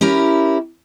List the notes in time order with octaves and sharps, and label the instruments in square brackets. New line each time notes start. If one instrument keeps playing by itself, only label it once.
[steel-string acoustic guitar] C#4 E4 G4 A#4